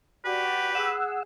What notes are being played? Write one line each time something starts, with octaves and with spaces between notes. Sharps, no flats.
F#4 G4 B4 D5
G#4 F#5 E6